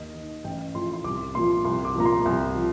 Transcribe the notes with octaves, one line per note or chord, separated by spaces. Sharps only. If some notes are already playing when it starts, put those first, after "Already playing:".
Already playing: D#2 D#5
D#3
A1 G5
A2 F3 C6
C6
C2 D6
A#2 F3 C6
C2 C6
D6
A#2 F3 A#5
C6
C2
F3